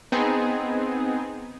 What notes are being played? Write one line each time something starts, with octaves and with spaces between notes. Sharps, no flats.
B3 C4 D#4 G#4